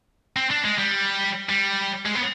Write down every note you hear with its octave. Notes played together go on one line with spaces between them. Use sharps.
C4
D4
G#3
G3
G3
G#3
B3